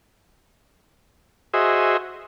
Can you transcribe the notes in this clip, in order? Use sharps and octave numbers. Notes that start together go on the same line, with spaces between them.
F#4 G#4 C5 D#5 E5